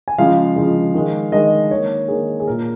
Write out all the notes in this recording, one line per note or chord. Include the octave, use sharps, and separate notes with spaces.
G#5
C#3 F3 G#3 F5
C#3 F3 G#3
D#3 G#3
D#3 G#3 D#5
D#3 A#3 C#5
D#3 A#3 G#4
G#4
A#2 A#3 A#4